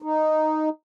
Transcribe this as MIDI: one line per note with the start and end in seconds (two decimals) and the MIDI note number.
0.02 0.69 63